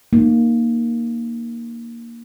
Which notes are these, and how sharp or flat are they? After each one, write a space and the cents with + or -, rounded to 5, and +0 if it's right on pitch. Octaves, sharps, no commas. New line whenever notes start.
A#3 +0 D#4 -25